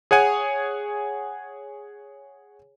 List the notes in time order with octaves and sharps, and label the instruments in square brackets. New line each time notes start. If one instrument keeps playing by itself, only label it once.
[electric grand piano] G#4 C#5 F#5 G#5